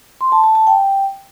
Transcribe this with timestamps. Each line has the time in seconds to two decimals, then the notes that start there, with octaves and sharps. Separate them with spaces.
0.21 C6
0.32 A5
0.44 A5
0.55 A5
0.67 G5